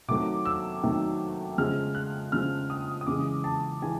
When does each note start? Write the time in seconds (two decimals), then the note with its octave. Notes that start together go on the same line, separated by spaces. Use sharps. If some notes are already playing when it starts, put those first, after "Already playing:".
0.08 C3 D#3 F#3 A3 D6
0.45 E6
0.83 C3 D#3 F#3 A3
1.58 C#3 F3 G#3 F6
1.95 F#6
2.32 C#3 F3 G#3 F6
2.70 D#6
3.01 D#6
3.07 C#3 E3 G#3 D6
3.44 A5
3.82 E3 G#3 G#5